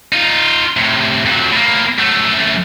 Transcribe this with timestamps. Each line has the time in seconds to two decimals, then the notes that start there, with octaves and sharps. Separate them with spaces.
0.12 D#4 F4
0.77 A2 C3
1.26 F2 F#3
1.52 A2 A#3
1.99 F#2 A3